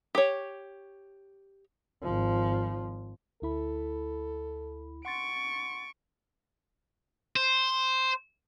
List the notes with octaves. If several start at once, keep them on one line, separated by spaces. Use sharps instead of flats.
G4 C#5
G#1 F3
D2 E4 A4 B5
F#5 C6 C#6 A6 D7
C5